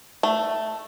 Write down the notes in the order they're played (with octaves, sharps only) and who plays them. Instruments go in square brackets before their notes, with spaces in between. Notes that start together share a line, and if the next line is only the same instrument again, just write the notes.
[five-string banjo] A3